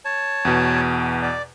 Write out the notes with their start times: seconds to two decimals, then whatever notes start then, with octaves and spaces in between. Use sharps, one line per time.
0.05 C#5 A5
0.45 E2 B2
1.22 D5